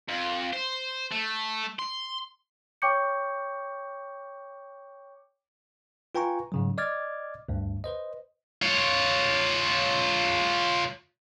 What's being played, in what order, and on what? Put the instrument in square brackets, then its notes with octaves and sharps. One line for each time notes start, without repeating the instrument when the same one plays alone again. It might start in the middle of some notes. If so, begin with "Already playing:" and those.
[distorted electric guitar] F2
C5
A3
C6
[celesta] C#5 G5 C#6 D6 G6 C#7
[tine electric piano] F4 B4 G5 G#5 A#5 C#6
G#2 C#3 F#3
D5 D#5 D6 F6 G#6 A6
D2 G2
B4 C5 D#5
[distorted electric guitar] F4 C#5